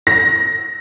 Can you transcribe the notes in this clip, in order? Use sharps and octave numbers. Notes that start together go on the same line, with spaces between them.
A#6